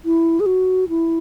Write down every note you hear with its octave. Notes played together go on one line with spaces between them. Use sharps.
E4
G#4
F#4
E4